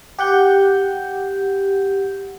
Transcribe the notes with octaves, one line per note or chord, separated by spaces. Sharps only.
G4 F#5 G6